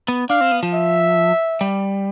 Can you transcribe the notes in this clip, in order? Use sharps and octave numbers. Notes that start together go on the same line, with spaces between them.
B3
D4 F5
C4
B3
F3
E5
G3